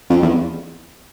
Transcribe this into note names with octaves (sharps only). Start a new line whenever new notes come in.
F2
E2